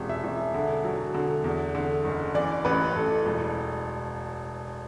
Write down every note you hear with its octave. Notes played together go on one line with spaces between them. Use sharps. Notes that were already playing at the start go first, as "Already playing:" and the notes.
Already playing: E1 C3
E5
E1
D3
F#3
D3
E2
D3
F#1
E3 D5
A1 B4
A1 A4
E1